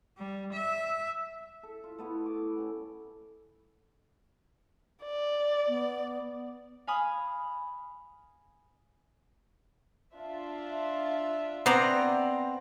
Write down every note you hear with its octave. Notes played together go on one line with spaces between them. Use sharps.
G3
E5
A4
F4
A3 B3 E4
D6
B3 C#4 G4
D5
B3
F5 G#5 B5 D#6
D4 F4 E5
B3 C4 C5 D5 A#5